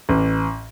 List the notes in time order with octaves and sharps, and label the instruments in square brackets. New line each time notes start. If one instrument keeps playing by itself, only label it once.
[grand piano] A1